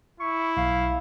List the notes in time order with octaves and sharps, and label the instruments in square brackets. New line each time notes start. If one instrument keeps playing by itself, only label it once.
[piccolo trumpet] E4 [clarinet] C#6
[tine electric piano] B1 [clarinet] F5